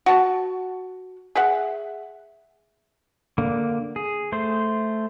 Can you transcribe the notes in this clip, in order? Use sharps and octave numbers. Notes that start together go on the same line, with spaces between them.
F#4 A5
G#4 E5 F#5
D3 A#3
G#4
A3 C5